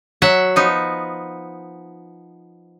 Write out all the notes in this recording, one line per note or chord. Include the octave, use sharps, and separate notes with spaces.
F#3 E5 F#5
F3 B3 D#4